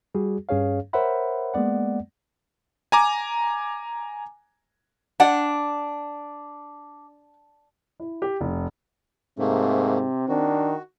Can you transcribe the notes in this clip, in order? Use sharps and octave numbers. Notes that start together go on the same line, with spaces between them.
G3 F#4 G#4
G2 C#4 G#4 C#5 F5
A#4 C5 C#5 E5 F#5 B5
G#3 A#3 B3 D5 F#5
G#5 A#5 D6
D4 D5 F#5 G5
E4
G4
F1
G#2 C3 A3 A#3 C4
D#3 D4 F#4